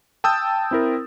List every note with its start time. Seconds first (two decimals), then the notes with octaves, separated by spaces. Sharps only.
0.24 G5 A5 D#6 E6 G6 A6
0.71 C4 E4 A#4